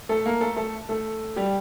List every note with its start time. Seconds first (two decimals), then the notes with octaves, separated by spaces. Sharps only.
0.09 A3 A4
0.26 A#3 A#4
0.41 A3 A4
0.56 A3 A4
0.89 A3 A4
1.36 G3 G4